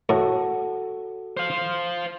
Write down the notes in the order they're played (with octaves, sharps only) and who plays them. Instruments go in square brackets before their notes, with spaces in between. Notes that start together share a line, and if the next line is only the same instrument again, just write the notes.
[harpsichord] A2 [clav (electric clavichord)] F#4 A4
[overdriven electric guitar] C5 F5